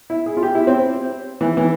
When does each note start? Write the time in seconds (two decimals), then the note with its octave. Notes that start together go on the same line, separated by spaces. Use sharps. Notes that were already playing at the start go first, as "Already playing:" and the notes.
0.10 E4
0.26 G#4
0.37 F4
0.43 G4
0.55 E4
0.67 C4
1.41 E3
1.57 E3